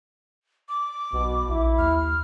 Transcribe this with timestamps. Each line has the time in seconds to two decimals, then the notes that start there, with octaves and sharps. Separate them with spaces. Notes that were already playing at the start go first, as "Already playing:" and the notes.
0.69 D6
1.13 B1 B2
1.49 A#1 E4
1.78 D#2 F6